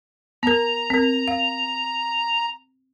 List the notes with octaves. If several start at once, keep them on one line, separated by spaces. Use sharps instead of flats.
B3 A#4 A#5
C4 A#4
F5